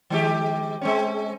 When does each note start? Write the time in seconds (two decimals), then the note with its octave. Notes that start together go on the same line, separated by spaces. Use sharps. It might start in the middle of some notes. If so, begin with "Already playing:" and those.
0.10 D#3 G#3 G4
0.81 G#3 C4 C#4